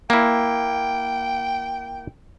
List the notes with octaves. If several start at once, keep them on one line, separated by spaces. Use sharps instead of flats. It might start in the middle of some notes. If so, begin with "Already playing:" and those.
A#3 E4 G5